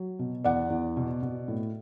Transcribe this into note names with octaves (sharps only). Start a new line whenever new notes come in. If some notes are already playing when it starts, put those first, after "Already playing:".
Already playing: F#3
B2
E2 D5 F#5
E2
B2
B2
A2